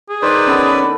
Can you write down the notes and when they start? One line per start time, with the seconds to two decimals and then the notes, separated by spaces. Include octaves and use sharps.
0.10 G#4
0.22 D#3 B4 C5 D5
0.47 B3 C#4 A4